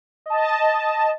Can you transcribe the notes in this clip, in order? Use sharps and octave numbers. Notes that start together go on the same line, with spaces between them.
D#5 A5